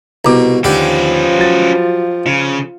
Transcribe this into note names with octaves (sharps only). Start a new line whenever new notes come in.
C2 B2 A#5 D6
D#2 D3 F3 C#4 G4 B4 D5
F#3 A6
C#3 F4